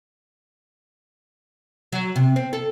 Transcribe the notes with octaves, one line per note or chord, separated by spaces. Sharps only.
F#3
C3
C4
A4